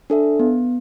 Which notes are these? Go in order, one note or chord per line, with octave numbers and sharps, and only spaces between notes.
D4 A4 E5
B3